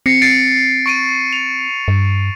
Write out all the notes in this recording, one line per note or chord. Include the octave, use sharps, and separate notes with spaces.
C4 A#6 C7 C#7
A6 C7 D7
C#6 D7 D#7
F7
G2